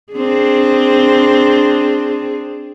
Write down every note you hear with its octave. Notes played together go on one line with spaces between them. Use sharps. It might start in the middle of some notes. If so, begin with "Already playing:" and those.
C4 D4 G#4